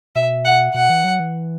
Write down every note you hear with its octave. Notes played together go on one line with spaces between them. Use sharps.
B2 E5
F#5
B2 F#5
E3
F#3
E3